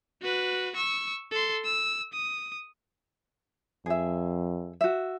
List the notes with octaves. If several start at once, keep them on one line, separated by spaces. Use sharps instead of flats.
F#4 B4
C#6 E6
A4 C6
E6
D#6
F2 G#4 E5
F#4 E5